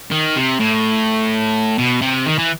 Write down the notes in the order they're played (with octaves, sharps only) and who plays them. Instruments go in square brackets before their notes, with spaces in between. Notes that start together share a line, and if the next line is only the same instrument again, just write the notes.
[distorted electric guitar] D#3
C3
A2
B2
C3
D#3
E3